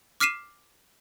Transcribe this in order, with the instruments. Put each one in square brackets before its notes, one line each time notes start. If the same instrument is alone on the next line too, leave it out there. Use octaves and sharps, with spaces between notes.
[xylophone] D6 F6 B6 C7 D#7 E7